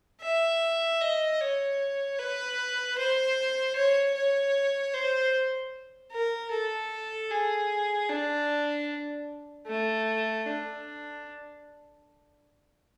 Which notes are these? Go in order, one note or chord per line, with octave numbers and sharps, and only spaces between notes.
E5
D#5
C#5
B4
C5
C#5
C#5
C5
A#4
A4
G#4
D4
A3
D4